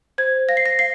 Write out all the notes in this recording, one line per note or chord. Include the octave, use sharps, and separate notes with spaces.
C5 G#6
F5 A#6
C7
A#6
F5 C7